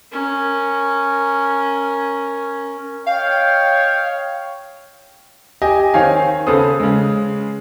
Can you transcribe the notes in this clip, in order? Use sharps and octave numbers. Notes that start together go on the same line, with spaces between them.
C#4 A#4
C#5 D#5 F5 G5
G4 D#5 G#5
D#3 C4 C#5 F5 G#5
C#3 B3 A4 C5 D#6
C#3 G#3